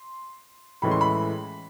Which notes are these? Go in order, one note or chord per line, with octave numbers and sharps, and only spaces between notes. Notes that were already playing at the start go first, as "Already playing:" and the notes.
Already playing: C6
A2 E3 G#3 C#4 B5
C6
B5